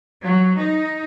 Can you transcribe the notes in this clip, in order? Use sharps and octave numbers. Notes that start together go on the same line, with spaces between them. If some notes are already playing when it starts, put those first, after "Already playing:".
F#3
D#4